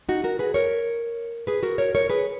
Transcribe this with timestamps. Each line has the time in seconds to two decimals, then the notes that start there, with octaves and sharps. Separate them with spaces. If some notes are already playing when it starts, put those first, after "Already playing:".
0.09 D#4 F#4
0.24 F#4 A#4
0.39 G#4 B4
0.54 A#4 C#5
1.47 G#4 B4
1.63 F#4 A#4
1.78 A#4 C#5
1.95 A#4 C#5
2.10 G#4 B4